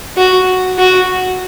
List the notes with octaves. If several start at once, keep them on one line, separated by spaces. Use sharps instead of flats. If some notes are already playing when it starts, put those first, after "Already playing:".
F#4
F#4